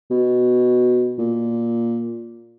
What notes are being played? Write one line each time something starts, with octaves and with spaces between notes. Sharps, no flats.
B2
A#2